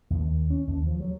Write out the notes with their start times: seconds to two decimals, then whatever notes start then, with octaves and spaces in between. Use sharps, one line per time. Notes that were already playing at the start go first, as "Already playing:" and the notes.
0.10 D#2
0.50 C#4
0.67 D#2
0.86 F3
1.00 F#3